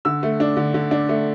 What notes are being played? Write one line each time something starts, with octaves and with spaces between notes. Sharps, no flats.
D3 E6
A3
D4
D3
D3
D4
A3